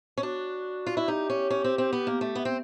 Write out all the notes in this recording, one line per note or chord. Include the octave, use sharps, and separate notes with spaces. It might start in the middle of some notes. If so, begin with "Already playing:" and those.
C#4
D4 F#4
F4
E4
D#4 G4
C#4
C#4
C4
C4
B3
A#3
A3
B3
C4